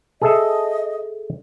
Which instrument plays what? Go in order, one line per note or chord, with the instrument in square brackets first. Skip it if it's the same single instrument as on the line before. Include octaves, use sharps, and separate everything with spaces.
[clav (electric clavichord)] G#4 A4 E5 [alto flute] D#5